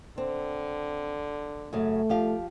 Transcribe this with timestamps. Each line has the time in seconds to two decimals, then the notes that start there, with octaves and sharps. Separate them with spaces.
0.18 D3 C4
1.73 F#2 C#3 A3
2.09 F3 G4 F5